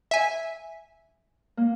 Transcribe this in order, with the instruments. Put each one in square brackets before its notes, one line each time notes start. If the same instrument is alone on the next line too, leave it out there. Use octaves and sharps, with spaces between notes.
[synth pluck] E5 G#5
[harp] A#3